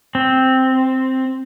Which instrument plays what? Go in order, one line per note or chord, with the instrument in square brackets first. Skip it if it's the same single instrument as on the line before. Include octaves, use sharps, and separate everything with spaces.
[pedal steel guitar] C4